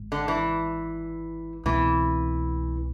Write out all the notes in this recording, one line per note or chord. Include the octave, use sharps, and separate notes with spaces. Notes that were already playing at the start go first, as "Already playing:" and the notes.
Already playing: G#1 G#2 G#3
D3
E3
C2 B2 E3 A3 C4